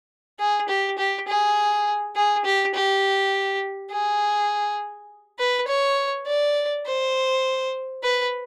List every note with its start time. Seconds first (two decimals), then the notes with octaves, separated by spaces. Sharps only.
0.39 G#4
0.69 G4
0.98 G4
1.28 G#4
2.16 G#4
2.45 G4
2.75 G4
3.91 G#4
5.39 B4
5.68 C#5
6.27 D5
6.86 C5
8.03 B4